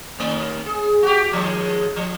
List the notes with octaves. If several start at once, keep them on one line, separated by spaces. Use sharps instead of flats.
D#2 A3
G#4
F#4 G4
D#2 F3 G#3
F3